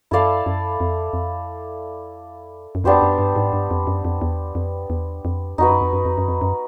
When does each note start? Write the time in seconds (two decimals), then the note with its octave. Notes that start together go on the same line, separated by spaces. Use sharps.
0.11 F#2 E4 A4 D5 F5
0.46 F#2
0.80 F2
1.13 F2
2.75 F#2
2.84 F2 B3 D4 G4 C5
3.02 F#2
3.19 G2
3.36 G#2
3.53 G2
3.71 F2
3.87 F#2
4.05 F2
4.22 E2
4.55 F2
4.90 E2
5.25 F2
5.58 F2 D#4 F#4 B4
5.70 F#2
5.81 F2
5.93 F#2
6.05 F2
6.18 F#2
6.28 F2
6.41 F#2